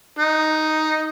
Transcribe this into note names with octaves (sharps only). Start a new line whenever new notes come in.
D#4